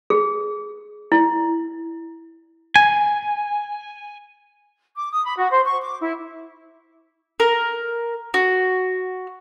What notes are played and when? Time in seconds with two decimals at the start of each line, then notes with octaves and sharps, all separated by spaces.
0.10 G#4
1.12 E4
2.76 G#5
4.95 D6
5.12 D#6
5.24 B5
5.38 F#4
5.51 C5
5.66 C#6
5.82 D6
6.00 E4
7.40 A#4
8.34 F#4